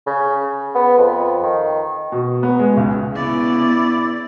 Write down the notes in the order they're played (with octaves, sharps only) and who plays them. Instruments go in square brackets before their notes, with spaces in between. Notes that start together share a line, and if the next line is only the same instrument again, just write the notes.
[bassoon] C#3
B3
F2
D#3
[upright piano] B2
B3
G#3
C#2
[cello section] C#3 B3 [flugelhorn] E4 [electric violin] D5